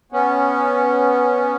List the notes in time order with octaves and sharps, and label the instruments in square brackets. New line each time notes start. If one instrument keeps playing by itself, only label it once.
[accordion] B3 C#4